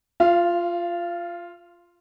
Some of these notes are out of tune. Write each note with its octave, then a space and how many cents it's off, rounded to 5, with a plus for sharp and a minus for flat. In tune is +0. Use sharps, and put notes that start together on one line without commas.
F4 +0 F5 -25